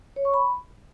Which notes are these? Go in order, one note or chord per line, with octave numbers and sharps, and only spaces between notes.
C#5
C#6
B5